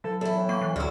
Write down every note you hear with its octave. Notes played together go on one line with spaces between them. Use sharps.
F#3 A4
E2 E4 A4
A2
A#3 C#6
E3
D2 D3 F#4 E6 F6